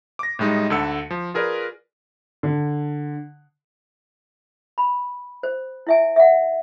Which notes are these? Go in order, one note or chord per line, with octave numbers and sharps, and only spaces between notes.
D6 A#6
A2 G3 G#3 D#4
D2 D3 A4 E6 C#7
F3
F4 G#4 A#4 B4 D5
D3
B5
C5
E4 E5 G#5
E5 F#5